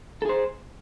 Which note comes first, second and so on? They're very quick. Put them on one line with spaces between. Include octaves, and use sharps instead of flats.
A4 G#4 C5